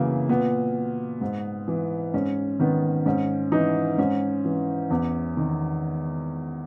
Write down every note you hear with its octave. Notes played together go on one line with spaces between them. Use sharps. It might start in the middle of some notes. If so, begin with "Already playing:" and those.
Already playing: F#2 C#3 E3 A#3 B3
A#2 B3
G#2
E3
G#2 C#4
D#3 B3
G#2 C#4
E3 D#4
G#2 C#4
E3
E2
D#3